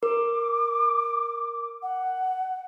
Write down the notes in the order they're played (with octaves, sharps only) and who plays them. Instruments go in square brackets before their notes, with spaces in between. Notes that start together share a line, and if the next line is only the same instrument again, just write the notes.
[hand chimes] A#4 [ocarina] D6
[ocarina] F#5